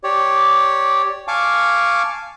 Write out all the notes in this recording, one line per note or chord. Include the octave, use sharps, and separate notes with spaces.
G4 C#5 D5
F5 G#5 A5 C#6 D6